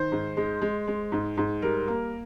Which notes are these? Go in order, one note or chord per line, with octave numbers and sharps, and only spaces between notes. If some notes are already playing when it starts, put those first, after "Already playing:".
Already playing: D#3 C5
G#2
G#3
G#3
G#3
G#2
G#2
G3 A#4
A#3